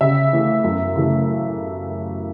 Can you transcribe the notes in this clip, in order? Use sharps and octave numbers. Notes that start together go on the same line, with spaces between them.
C#3 E5
E3 A3
F#2
C#3 E3 A3